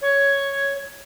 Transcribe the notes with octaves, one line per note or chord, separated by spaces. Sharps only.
C#5